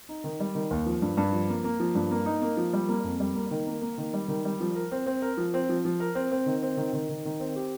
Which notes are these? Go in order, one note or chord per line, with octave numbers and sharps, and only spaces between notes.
D#4
D#3
G3
D#3
D#2
F3
G2
G2
F3
A#3
A#3
F3
G2
A#3
D#4
A#3
F3
G3
A#3
F2
G3
A#3
D#3
A#3
A#3
D#3
G3
D#3
G3
F3
A#4
C4
C4
A#4
F3
C4
F3
F3
A#4
C4
C4
D#3
C4
D#3
D#3
D#3
D#3
C4
G4